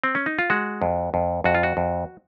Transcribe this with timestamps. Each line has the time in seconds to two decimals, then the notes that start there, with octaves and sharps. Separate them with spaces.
0.04 C4
0.15 C#4
0.26 D#4
0.39 F4
0.50 G#3 F#4
0.82 F2
1.14 F2
1.44 F2 F#4
1.55 F4
1.63 F#4
1.77 F2